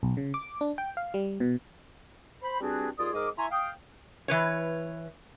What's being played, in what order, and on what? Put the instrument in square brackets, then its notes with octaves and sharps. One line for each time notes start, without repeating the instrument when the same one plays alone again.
[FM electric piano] B1
C#3
D6
D4
G5
F5
G3
B2
[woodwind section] C5 B5
G3 C4 D4 F#4 G#4 B4
D#2 F4 G#4 D5 D#6
G#2 G#4 A#4 D#5 D6
E4 E5 G#5 A#5 C6 C#6
F5 G5 D#6
[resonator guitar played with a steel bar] E3 B4 C#5